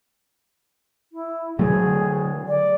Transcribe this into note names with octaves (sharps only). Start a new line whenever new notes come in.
E4
D3 F#3 A3 G#4
D5